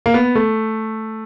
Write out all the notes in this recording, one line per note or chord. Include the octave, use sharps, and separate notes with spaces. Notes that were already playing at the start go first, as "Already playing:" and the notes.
A#3
B3
A3